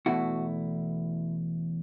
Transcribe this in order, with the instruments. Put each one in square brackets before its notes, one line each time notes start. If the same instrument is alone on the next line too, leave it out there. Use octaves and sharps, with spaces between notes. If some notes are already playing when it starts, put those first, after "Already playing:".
[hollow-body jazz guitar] E2 B2 A3 E4 F#4